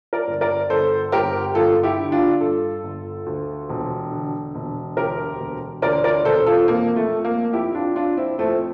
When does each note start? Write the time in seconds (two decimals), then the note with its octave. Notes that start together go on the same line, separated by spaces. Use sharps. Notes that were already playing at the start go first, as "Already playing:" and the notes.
0.13 A#4 D5
0.27 G1
0.41 A#4 D5
0.70 G1 A4 C5
1.12 G1 G4 A#4
1.55 G1 F4 A4
1.83 E4 G4
1.98 D3
2.12 D4 F4
2.41 G2 F4 A4
2.83 G1
3.26 D2
3.69 E1
4.12 D3
4.55 E1
4.97 D2 G4 A#4
5.40 E1
5.82 D2 A#4 D5
6.04 A#4 D5
6.25 E1 A4 C5
6.46 F4 A4
6.68 F2 A#3
6.96 A3
7.11 F2
7.25 A#3
7.53 F2 E4 G4
7.75 D4 F4
7.96 F2 D4 F4
8.17 C4 E4
8.39 F2 A3 C4